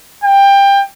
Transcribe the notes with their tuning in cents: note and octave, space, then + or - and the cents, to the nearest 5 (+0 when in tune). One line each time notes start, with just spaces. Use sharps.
G5 +20